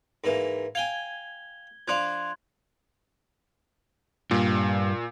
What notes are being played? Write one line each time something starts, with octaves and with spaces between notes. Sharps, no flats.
G#2 E3 A#3
F5 G5 G#5 G#6 G7
F3 D4 F5 C6 F#6 G#6
G2 A#2